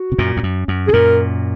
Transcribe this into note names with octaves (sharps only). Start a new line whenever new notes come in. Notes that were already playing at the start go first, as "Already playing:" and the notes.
Already playing: F#4
C3
F#2 A#2
F2
F#2
F#2
C3 G#4
F#2 A#2 A#4